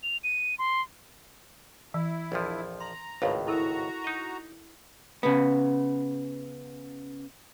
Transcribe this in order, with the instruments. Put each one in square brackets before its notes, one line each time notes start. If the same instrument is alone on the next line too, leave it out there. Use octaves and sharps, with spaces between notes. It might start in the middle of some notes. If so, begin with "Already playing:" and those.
[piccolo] F7
D#7
C6
[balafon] E3 [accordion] E4
[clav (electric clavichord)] A#1 F2 F3
[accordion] A#5 [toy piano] C6
[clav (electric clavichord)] G#1 C#2 A2 [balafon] B4 C#5 F5
[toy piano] E4 A4 A#4 [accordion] F#4 A#5
[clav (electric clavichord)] D#4 D#5
[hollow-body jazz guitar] C#3 B3